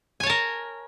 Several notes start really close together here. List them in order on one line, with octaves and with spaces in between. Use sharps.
G#5 C#5 A5 A#4